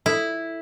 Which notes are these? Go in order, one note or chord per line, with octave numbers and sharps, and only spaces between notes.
E4 F4 A4 D5